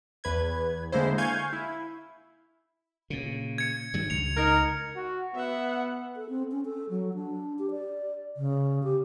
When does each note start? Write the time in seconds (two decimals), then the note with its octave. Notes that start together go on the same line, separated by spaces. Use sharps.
0.24 E2 B4 G#6
0.92 D3 G#3 A#3 E4 C5
1.18 F5 G#5 C#6 G6 G#6
1.53 E4
3.10 A#2 C#3
3.58 G#6 C#7
3.94 G2 D#3 F#3
4.10 C#2 C#7 F7
4.37 D#4 A#4
4.96 F#4
5.35 B3 E5 F#5
6.16 A4
6.29 C4
6.51 C#4
6.65 A4
6.90 F#3
7.15 D4
7.59 G4
7.71 D5
8.37 C#3
8.83 G4